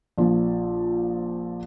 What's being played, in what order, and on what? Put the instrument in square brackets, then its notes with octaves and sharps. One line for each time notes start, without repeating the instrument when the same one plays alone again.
[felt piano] A#1 F3